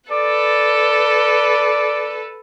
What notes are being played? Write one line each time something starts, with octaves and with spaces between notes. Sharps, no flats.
A4 B4 D5